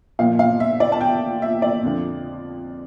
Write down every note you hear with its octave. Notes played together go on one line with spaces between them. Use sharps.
A#2 F3 F5
F5
E5
D5
A5
G5
E5
D5
F2 D3 F3